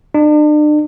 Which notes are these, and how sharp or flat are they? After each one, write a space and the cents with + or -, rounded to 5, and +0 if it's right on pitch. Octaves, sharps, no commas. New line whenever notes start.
D4 +40